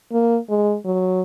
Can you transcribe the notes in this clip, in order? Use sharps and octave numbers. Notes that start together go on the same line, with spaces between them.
A#3
G#3
F#3